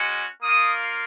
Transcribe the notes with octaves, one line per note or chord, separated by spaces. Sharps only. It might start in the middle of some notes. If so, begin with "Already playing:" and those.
Already playing: G#3 C#4 F#4
A#3 F4 D#6